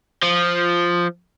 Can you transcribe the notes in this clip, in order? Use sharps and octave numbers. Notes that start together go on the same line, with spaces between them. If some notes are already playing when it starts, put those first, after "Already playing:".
F3